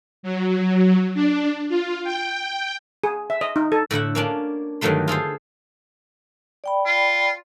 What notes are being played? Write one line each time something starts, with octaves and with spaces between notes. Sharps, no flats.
F#3
D4
F4
G5
G#4
E5
D#5
D#4
A4
A2 D3 E4 F#5
A#3 C#4 D4 F4
G2 D3 D#3 F#3 A3 C6
F4 G#4 A4 C5
D5 G5 B5
F4